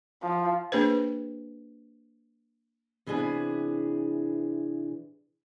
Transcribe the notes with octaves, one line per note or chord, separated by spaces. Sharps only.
F3
A#3 D4 G#4 B4 C5
C3 E3 B3 D4 G#4 B4